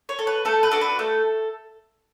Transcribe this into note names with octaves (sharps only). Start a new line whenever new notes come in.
C#5
A4
B4
A3 A4
B4
D4 F#4 A4
B4
A3 A4